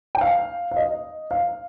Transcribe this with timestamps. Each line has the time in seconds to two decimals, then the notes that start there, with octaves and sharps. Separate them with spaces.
0.15 G5
0.21 F5
0.71 F5
0.77 D#5
1.31 F5